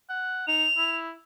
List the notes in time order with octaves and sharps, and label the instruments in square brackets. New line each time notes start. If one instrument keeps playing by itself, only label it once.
[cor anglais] F#5
[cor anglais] D#4 [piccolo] F7
[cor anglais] E4